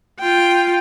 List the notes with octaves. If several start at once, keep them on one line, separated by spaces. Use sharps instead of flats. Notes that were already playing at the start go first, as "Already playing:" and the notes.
F4 G5